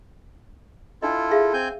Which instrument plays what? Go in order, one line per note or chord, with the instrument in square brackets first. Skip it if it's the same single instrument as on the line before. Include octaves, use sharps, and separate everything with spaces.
[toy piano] D4 D#5 [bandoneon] E4 F4 A4
[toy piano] G#4 E5 F5
[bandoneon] C4 G#5 G6